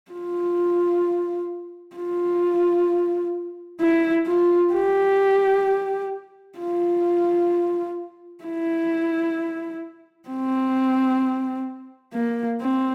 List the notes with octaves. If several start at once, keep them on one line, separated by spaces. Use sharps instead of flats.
F4
F4
E4
F4
G4
F4
E4
C4
A#3
C4